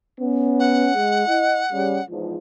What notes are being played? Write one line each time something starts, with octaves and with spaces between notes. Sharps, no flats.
B3 C#4
F#5
G#3
E4 D#5
C#3 G3
E2 G#2 F3